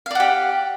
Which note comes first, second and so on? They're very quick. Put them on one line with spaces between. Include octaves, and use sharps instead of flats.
F5 D5 F#5 G4